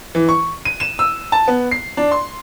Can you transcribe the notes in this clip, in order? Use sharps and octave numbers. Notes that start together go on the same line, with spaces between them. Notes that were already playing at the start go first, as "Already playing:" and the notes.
E3
C#6
D#7
E7
E6
A5
B3
C7
D4
C6